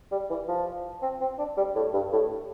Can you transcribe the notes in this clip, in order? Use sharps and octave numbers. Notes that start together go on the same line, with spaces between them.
G3
E3
F3
C4
C4
D4
G3
A2
G2
A2